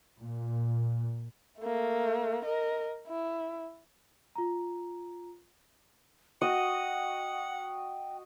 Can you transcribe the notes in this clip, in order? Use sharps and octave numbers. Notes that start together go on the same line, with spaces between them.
A#2
A3 A#3
A#4 D#5
E4
F4 A#5
F#4 D#5 F#5 G5